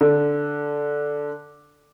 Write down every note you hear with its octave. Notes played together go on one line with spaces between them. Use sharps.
D3